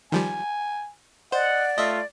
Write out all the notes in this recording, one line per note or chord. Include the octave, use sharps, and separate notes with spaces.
D#3 F3 G3 G#5
C5 D5 D#5 F#5
A3 F4 D#5 E5